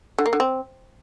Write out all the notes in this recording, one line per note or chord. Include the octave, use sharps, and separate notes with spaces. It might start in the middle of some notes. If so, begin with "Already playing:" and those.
D3
A#3
D3
C4